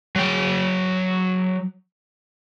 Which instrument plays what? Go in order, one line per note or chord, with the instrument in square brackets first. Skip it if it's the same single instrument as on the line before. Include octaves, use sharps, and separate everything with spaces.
[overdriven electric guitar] F#3 G5